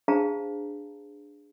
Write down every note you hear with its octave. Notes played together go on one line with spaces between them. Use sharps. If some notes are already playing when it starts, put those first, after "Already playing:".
D4 G#4 C5 F5 A5 A#5